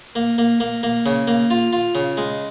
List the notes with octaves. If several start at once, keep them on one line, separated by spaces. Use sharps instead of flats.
A#3
A#3
A#3
A#3
C#3
A#3
F4
F4
C#3
G#3